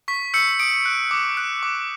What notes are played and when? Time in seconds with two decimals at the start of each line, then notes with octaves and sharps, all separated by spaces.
0.08 C#6 B6
0.34 E6 G6 C#7
0.60 D#6 D7
0.85 F#6
1.11 D6
1.37 F#6
1.63 D6